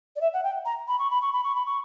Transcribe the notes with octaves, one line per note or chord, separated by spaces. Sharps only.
D5
E5
F#5
G5
A#5
B5
C#6
B5
C#6
B5
C#6
B5
C#6